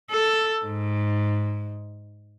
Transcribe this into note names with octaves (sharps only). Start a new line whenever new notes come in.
A4
G#2